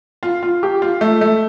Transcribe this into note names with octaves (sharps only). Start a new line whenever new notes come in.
F4
F4
G4
F4
A3
A3